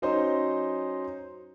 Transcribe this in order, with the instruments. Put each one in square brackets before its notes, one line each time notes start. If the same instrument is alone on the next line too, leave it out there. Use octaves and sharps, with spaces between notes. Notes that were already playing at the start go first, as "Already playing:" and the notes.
[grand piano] F#3 C#4 D#4 C5 D#5